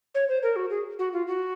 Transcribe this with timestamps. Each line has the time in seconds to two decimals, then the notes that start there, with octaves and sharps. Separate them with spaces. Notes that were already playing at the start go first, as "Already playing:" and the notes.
0.15 C#5
0.29 C5
0.43 A#4
0.56 F#4
0.70 G#4
0.99 F#4
1.13 F4
1.27 F#4